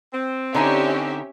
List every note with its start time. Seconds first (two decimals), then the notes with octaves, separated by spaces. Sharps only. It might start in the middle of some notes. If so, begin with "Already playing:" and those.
0.13 C4
0.54 D3 C#4 D#4 G4 E5 G#5